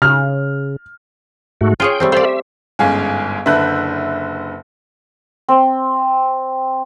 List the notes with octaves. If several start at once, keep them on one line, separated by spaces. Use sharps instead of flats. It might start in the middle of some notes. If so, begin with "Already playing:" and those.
C#3 F6
G#2 A3 F#4
F4 G#4 C#5 G5
G3 A3 C4
A4 C5 D5 F5 B5
E5
G1 G#2 C#4 G#4 F5
F#1 D3 B4 E5 F#6 G6
C4